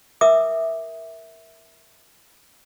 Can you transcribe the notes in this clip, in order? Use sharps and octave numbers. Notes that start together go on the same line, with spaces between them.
A#4 E5 D6 D#6